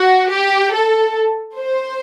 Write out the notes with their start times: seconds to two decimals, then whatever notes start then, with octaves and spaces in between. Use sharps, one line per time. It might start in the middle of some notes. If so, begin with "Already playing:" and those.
Already playing: F#4
0.31 G4
0.74 A4
1.58 C5